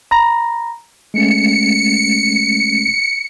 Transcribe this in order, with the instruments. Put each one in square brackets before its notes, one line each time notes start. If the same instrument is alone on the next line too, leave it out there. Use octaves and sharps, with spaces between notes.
[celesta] A#5 B5 A#6
[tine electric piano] G#3 A3 C#4 [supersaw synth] C#7